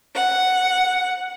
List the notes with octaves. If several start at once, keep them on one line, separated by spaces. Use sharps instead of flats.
F#5